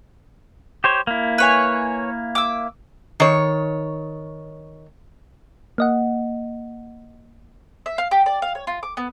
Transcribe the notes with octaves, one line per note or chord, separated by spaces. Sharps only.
G4 C5 C#5
A#3 E4
B4 C#5 G#5
D6 E6
D#3 C#5
A#3 D#5 F#5
E5
F5
G4
D5
F5
C#5
F4
D6
B3